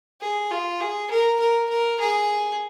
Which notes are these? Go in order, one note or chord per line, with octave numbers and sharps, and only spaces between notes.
G#4
F4
G#4
A#4
A#4
A#4
G#4